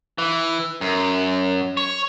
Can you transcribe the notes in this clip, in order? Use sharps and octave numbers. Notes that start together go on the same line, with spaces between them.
E3
F#2
C#5